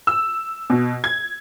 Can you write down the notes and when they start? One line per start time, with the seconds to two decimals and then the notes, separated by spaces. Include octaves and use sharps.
0.07 E6
0.70 B2
1.04 G#6